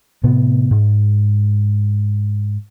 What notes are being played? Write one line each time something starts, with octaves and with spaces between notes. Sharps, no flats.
A2 C3 B3
G#2